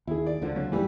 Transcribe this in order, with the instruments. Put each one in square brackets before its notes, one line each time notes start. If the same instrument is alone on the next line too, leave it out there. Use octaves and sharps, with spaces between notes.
[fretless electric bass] D#2 [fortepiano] E4 G#4
[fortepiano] D5
[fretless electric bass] C#2 D3 F3
[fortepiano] F#3
[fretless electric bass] A1 E2 G#2 [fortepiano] E3 G3